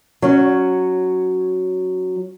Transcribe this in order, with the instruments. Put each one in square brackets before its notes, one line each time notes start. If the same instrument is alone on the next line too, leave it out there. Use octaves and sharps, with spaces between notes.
[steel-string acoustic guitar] F#3 C#4